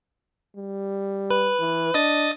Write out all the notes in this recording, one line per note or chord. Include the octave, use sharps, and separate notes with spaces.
G3
B4
E3
D4 D#5 D#6 A6